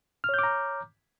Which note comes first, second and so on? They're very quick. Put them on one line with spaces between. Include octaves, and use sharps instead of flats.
F6 C#5 G6 D6 A#5